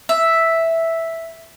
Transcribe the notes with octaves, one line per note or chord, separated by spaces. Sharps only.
E5